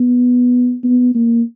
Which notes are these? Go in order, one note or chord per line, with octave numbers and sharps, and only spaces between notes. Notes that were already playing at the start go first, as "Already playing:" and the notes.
Already playing: B3
B3
A#3